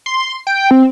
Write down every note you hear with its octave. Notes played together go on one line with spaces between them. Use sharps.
C6
G5
C4